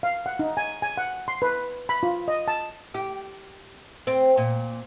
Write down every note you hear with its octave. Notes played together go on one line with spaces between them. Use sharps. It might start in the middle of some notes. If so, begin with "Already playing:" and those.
F5
F#5
D#4
G#5
G#5
F#5
C6
B4
B5
F4
D#5
A5
G4
C4
A#2